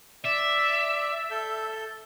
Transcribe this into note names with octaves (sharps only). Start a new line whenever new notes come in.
D5 E5
A4 G6